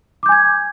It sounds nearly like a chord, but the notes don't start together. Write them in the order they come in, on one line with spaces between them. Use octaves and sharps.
D6 G6 G#5 G#6